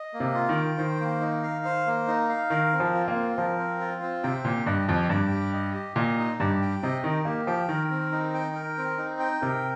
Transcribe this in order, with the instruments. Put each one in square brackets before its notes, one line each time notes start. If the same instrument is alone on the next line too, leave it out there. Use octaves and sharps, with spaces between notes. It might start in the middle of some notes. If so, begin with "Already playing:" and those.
Already playing: [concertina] D#5
A#3
[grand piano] C3
[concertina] F4
[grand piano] D#3
[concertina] G5
[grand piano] D#3 [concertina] C5
[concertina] A#3
D#4
F5
C5
A#3
D#4
F5
[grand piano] D#3 [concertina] A#4
[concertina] C4
[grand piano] F3
[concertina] F4
[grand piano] A#3
[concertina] C4
[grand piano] F3 [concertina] A#4
[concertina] C4
F4
C4
[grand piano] C3 [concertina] G5
[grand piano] A#2 [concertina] G4
[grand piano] G2 [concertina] D#5
[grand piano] F2 [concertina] G4
[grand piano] G2 [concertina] G5
[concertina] G4
D#5
G4
[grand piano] A#2 [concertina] D#5
[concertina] D#4
[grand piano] G2 [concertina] G4
[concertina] G5
[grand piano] C3 [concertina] D#5
[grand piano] D#3 [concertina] D#4
[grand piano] A#3 [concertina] G4
[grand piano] F3 [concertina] G5
[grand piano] D#3 [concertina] A#4
[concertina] C4
D#4
G5
A#4
C4
D#4
G5
[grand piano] C3 [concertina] A#4